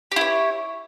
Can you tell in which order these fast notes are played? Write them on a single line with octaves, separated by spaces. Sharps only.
G4 E4 C#5